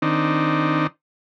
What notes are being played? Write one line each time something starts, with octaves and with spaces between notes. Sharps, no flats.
D#3 C4 D4 D#4